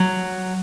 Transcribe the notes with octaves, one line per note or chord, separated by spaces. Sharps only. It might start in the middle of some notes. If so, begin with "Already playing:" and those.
Already playing: F#3